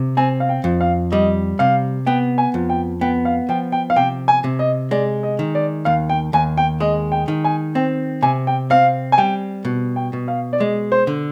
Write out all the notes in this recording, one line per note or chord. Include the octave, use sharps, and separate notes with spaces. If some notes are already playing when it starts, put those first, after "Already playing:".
Already playing: C3
C4 G#5
F5
G5
F2
F5
G3 D#5
C3 F5
B3 G5
G#5
F2
G5
B3 G5
F5
F3 G5
G5
F5
C3 G5
G#5
C3
D#5
G#3 D5
D#5
D#3
D5
D#2 F5
G5
D#2 G#5
G5
G#3 D#5
G5
D#3
G#5
C4 G5
C3 G#5
G5
C4 F5
G#5
G3 G5
B2
G5
B2
F5
D5
G#3 D#5
C5
D3